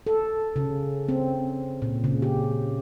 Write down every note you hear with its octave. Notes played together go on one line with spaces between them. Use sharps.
A4
C#3
C4
A#2
C#3
G4